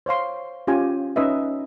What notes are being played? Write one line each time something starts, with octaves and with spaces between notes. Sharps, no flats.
C5 C#5 F5 C6
C#4 F4 G4 G#5
C#4 D#4 B4 D#5 E5